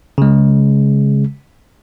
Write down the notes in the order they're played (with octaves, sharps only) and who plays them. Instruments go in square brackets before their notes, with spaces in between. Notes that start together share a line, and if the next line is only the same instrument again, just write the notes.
[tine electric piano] C#3 G#3